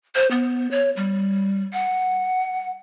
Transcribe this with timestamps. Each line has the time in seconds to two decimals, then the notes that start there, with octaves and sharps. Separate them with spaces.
0.15 C5
0.31 B3
0.71 C#5
0.97 G3
1.73 F#5